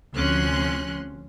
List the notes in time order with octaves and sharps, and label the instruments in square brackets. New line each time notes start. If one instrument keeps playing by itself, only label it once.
[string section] D2 C3 F3 C#4 C6 F#6